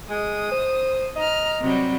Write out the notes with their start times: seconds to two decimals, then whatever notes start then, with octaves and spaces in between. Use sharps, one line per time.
0.10 G#3 D#6
0.52 C5
1.16 D#5 A#5 F6
1.62 C3 F#3 G3